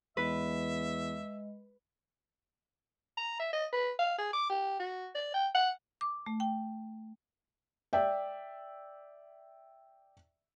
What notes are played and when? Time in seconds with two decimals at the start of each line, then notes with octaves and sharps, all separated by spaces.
0.17 E2 G#3 B4 D#5 E5
3.17 A#5
3.40 E5
3.53 D#5
3.73 B4
3.99 F5
4.18 G#4
4.33 D6
4.50 G4
4.80 F#4
5.15 D5
5.34 G5
5.55 F#5
6.01 D6
6.26 A3
6.40 G5
7.93 D5 E5 G5